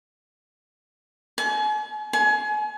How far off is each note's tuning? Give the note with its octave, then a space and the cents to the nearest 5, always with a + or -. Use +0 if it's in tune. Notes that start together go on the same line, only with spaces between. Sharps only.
G#5 +40
G#5 +30